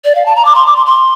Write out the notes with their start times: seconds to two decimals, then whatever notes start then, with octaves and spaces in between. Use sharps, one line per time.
0.05 D5
0.15 F5
0.26 A5
0.36 A#5
0.45 D6
0.55 C6
0.67 D6
0.76 C6
0.86 C6